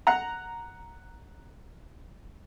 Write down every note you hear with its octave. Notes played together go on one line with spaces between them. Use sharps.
F#5 A#5